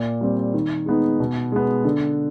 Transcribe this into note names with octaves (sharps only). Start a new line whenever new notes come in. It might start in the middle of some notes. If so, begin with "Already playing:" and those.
Already playing: A#2
G3 C4
D#3
G#3 B3 D#4
B2
G#3 B3
D3